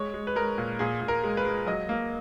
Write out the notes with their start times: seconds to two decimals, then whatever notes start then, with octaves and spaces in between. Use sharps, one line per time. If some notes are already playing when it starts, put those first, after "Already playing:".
Already playing: G#3 C#5
0.14 G#3
0.27 B4
0.36 G#3 A#4
0.58 A#2
0.79 A#2 G#4
1.01 A#2
1.08 A#4
1.24 G#3
1.37 B4
1.45 G#3
1.67 F#3 D#5
1.89 A#3